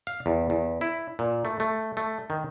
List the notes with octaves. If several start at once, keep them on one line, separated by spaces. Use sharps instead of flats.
F5
E2
E2
E4
A#2
A3
A3
A3
D#3